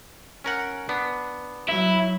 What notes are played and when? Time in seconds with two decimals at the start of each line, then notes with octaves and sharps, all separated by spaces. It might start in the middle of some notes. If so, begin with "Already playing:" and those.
0.44 C#4 A#4 F#5
0.89 B3 D4
1.69 F#3 E4